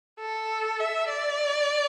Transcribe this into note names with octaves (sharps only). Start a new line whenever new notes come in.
A4
E5
D5